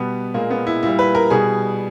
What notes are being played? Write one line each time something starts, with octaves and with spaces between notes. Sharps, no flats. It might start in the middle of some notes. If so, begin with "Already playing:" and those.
Already playing: B2 G3 B3
A#2 G#3 A#3
B3
E4
A#2 G3 E4
B4
A#4
B2 G3 G#4